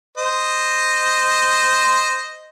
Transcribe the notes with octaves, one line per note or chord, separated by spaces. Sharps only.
C5 D#5